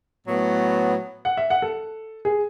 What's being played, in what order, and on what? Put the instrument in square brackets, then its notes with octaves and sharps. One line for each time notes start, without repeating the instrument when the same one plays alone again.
[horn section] A2 F#3 B3
[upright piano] F#5
E5
F#5
A4
G#4